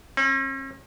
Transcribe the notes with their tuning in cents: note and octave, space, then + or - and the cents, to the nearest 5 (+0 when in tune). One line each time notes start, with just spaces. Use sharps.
C#4 -45